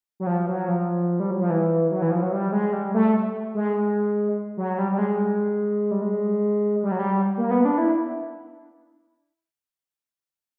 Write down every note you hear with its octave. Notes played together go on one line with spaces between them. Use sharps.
F#3
F3
F#3
F3
G3
F#3
F3
E3
F#3
E3
F3
F#3
G3
G#3
G3
A3
G#3
F#3
G3
G3
G#3
G3
G#3
G3
F#3
G3
A#3
B3
D4
E4